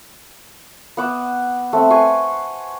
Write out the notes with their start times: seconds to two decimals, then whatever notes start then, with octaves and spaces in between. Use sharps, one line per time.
0.97 B3 F#5 D6 E6
1.73 A3 C4
1.90 B4 G#5 C6 C#6